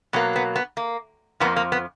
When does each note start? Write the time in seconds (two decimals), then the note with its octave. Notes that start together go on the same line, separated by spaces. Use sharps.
0.13 B2 F#3 A#3 B3
0.36 B3
0.56 B3
0.77 A#3
1.40 F2 F3 A#3 B3
1.56 A#3
1.72 B3